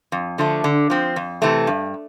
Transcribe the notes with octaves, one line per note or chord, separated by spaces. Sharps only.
F2
D3 F3 A3
D3
F3 C4
F2
C3 E3 A3
G2